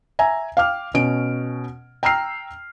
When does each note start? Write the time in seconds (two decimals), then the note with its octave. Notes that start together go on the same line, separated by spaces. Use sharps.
0.19 E5 G#5 A#5
0.57 F5 G5 D6 F6
0.94 B2 C#4 D7
2.03 G5 A#5 E6 F6 C7